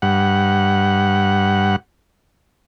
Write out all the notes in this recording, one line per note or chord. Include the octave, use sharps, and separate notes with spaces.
G2 F#5